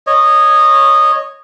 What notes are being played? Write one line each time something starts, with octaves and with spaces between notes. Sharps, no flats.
C#5 D#5